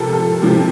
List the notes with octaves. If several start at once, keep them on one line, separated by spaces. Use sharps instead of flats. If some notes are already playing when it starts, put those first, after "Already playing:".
Already playing: C3 F3 A4 A#4
A4
C3 F3 C4 G4